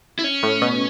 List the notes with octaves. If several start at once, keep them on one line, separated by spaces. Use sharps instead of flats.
E4
C#4
A2
B2